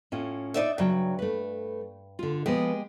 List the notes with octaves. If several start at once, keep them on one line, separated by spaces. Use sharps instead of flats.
A2 C#4 F4
D#4 D5 E5
G2 C#3 F#3 G5
A3 B4
D3 F4
F3 G#3 B3 G4 G#4